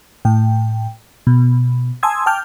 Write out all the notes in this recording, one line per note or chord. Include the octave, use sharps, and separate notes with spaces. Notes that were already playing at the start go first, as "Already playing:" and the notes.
A2 G5
B2
G#5 A5 C6 D#6 E6 G#6
G5 A5 D6 F6 G6